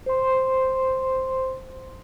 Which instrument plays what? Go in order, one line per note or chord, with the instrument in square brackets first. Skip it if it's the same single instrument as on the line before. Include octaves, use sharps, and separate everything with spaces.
[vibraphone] C5 C6